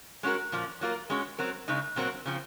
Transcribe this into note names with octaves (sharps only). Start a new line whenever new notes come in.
G#3 C#4 F#4 A#4
A#2 F3 A#3
F#3 A#3 F4 A#4
G#3 C#4 F#4
F#3 C4 F#4 A#4
C#3 G#3 D#4
A#2 F#3 C4 F#4 A#4
C#3 F3 C4